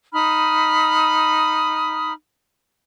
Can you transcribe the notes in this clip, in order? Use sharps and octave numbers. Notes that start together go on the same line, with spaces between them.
D#4 B5 D#6 F6